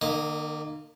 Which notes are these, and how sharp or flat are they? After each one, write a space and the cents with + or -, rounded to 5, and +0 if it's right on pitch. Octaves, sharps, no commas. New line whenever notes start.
D#3 -45 A#3 +0 D#5 +0